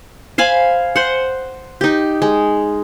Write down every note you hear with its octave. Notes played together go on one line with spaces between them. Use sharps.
C5 F5 G#5 B5
C5 F#5
D#4 G4
G#3